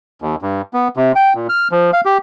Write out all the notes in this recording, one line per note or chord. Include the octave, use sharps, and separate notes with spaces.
D#2
G2
B3
C3
G5
A#2
F6
F3
F5
G4